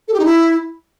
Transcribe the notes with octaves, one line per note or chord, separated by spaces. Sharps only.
A4
G4
D#4
E4